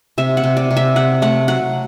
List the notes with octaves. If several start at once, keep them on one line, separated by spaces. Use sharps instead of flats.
C3 E5
F#5
C3
D5
C3
E5
C3 F#5
A3 F#5
F#3 F#5